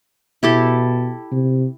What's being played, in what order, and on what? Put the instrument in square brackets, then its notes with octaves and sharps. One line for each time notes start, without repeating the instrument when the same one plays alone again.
[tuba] B2 [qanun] E4 G4 A4
[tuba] C3